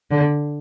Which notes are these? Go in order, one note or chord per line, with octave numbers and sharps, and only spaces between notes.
D3